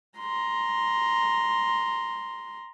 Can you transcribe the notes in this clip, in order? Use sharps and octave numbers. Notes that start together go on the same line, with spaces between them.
A#5 C6